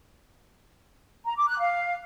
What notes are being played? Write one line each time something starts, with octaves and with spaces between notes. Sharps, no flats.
A#5
D6
F#6
F5